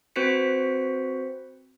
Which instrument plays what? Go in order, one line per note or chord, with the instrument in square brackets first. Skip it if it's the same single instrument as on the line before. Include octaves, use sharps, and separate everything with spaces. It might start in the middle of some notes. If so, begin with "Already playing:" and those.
[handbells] C4 F#4 B4 C5 B6 C#7